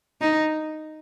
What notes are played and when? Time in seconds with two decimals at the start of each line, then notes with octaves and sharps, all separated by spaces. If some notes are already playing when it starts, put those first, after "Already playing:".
0.21 D#4